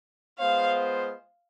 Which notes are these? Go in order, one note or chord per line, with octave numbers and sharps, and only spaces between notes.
G#3 B3 F4 C5 F5